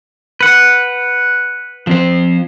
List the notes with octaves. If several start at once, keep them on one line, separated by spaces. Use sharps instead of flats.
B4 F#5
F3 C4 C5